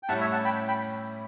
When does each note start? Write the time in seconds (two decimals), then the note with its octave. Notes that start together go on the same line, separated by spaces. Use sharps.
0.03 G5
0.09 A2 G3 C#4 E4 F#5 A5
0.21 C#5 E5
0.32 F#5 A5
0.45 G5 B5
0.68 G5 B5